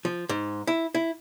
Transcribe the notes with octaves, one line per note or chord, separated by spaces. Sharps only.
F3
G#2
E4
E4